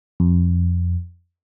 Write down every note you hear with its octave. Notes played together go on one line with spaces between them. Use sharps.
F2